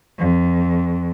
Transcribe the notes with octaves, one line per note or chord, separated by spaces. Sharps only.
F2